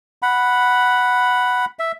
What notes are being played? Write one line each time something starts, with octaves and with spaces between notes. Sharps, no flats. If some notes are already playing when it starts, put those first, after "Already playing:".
F#5 B5
E5